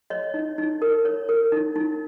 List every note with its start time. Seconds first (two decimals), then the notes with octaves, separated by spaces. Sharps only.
0.10 C#5 D#5
0.34 D#4
0.58 D#4
0.82 A#4
1.05 C#5
1.29 A#4
1.52 D#4
1.76 D#4